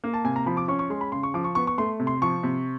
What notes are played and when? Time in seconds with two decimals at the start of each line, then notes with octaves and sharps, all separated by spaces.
0.04 A#3
0.14 A5
0.24 C3 G#5
0.36 A#5
0.46 F3 B5
0.57 D6
0.68 C#4 C#6
0.79 C#6
0.90 G#3 C6
1.01 B5
1.12 C#3 C6
1.23 C#6
1.34 F3 D6
1.44 C#6
1.55 B3 C#6
1.67 C#6
1.78 A3 C6
2.00 C3
2.07 C6
2.22 F3 C#6
2.43 C3